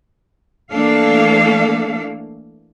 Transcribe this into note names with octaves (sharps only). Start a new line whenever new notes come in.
E3 A3 A#3 D4 A4 F5